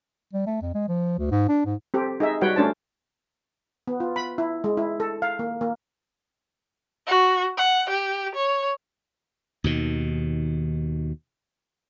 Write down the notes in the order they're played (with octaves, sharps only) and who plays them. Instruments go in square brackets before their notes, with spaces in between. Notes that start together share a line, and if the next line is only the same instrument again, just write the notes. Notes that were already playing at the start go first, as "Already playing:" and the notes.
[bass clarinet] G3
A3
F2
G#3
F3
D2
G#2
D4
G#2
[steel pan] C4 G4 A4
D#4 G#4 E5
G3 F#4 B4 C#5 F#5 G5
A3 C#4 D4 C5 A5
B3
F4
B5
E4
G#3
E4
A4
F5
A#3
A#3
[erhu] F#4
F#5
G4
C#5
[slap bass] D#2 B2 D#3